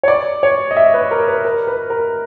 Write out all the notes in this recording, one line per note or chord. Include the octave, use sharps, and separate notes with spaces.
C#5
D5
C#5
D#5
E5
B4
A#4
B4
A#4
B4
A#4